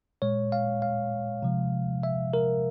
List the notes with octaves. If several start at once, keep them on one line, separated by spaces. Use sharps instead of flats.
A#2 G#3 C#5
F5
F5
C3 F3 G#3
E5
A#4